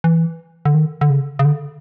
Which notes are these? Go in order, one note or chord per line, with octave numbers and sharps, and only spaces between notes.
E3
D3
D#3
D3
C#3
C#3
D3